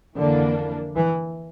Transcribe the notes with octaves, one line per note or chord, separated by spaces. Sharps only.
F2 D3 E3 A#3 D4
E3